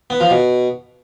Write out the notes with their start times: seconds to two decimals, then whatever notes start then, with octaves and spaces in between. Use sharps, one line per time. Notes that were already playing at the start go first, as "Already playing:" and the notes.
0.10 B3
0.20 F3
0.30 B2